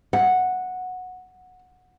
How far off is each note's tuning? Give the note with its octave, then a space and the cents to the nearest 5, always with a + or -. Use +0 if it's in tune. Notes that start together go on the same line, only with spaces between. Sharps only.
F#5 -10